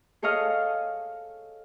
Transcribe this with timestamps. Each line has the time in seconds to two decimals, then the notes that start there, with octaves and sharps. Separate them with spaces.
0.22 G#4 A4 C#5 D#5 F5